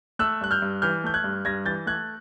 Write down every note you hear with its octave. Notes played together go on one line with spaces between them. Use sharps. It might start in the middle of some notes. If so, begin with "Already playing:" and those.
A3 E6 F#6
G2 F#6
F6 G6
G2
E3 F6 G6
A3 G6
F#6 G#6
G2
G2 G#6 A#6
E3 G6 A6
A3 F#6 G#6